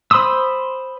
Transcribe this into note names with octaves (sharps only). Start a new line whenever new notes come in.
C5 B5 C6 D#6 E6